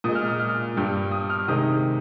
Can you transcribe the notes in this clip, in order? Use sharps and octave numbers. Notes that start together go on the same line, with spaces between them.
A#2 G#3 D#6
F6
D#6
F6
G2 G3
D#6
F6
C3 D#3 G#3 D#6